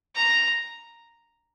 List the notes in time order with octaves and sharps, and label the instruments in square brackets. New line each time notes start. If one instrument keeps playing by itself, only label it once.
[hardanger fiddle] A#5